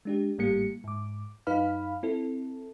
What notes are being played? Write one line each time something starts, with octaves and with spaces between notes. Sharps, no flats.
G#3 D4 G4
G#1 A2 G3 A#3 G4 C#7
G#2 D6
F#2 D#4 B4 F5 B5 F6
C4 E4 A4